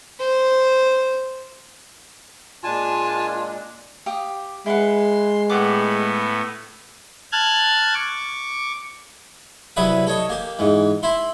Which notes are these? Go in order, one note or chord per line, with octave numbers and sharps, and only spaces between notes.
C5
A#2 G#3 D4 F4 G#5 A5
G4 F5 D#6
G#3 E4 B4 F#5 C6
A2 B3 G4 F#5 D6
A5 F6 F#6 G#6
C#6 D6
C2 F#3 E4 B4 E5 D#6
A4 C#5 D#5 A5
A#3 G4
G#2 E3
E4 E5 C6